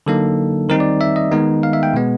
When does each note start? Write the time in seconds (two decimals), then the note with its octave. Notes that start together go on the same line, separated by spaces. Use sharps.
0.06 D3 F#3 A#3 D#4 A4
0.69 D#3 G3 C4 D#4 A#4
0.80 D5
1.01 E5
1.16 D#5
1.31 D#3 G#3 B3 D#4
1.63 F5
1.73 E5
1.83 G5
1.94 B2 G#3 B3